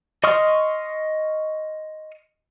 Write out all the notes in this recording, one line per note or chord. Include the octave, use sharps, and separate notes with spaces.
D#5 C6 C#6 D#6 F6